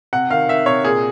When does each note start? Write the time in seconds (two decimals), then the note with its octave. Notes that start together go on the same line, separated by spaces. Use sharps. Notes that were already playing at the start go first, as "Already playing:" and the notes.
0.13 C3 F#5
0.31 D#3 F5
0.48 D#3 E5
0.66 C3 C#5
0.84 A#2 G#4